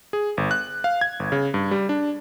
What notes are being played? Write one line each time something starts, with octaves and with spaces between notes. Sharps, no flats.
G#4
G1
F#6
F5
G#6
G1
C#3
G2
G3
D4